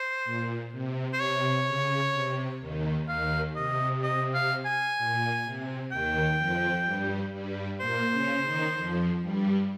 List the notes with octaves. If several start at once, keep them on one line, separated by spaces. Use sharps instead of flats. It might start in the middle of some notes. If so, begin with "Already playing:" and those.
Already playing: C5
A#2
C3
C5
C3 C#5
C#3
C3
D#2 D#3
D#2 D#3 F5
C3 D#5
D#5
F5
G#5
A#2
C3
D#2 D#3 G5
F2 F3
G2 G3
G2 G3
A#2 A#3 C5
C#3 C#4
D#3 D#4
F2 F3
G2 G3